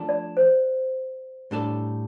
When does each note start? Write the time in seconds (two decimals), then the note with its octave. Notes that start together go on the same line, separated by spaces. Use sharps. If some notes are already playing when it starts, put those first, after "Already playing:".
Already playing: F3 A3 D4 A4
0.09 D5
0.37 C5
1.51 A2 G3 D4 A4 D5